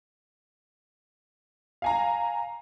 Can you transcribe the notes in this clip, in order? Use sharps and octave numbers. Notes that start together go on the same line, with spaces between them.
F5 G#5 A#5